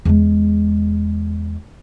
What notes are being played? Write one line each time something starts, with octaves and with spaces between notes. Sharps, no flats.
E2 G#3